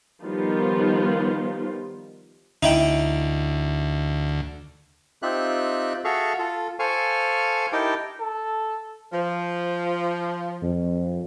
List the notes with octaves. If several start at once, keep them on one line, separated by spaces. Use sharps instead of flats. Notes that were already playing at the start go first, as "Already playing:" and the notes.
D#3 F3 G3 B3 D#4 F4
D2 D#4 E4 G5
C4 D#4 F4 G4 E5 F#6
F#4 G#4 A4 E5 F5 C#6
F4 A4
A4 C5 F5 G#5 C#6
D#4 E4 G4 A#4 G5 A5
A4
F3
F2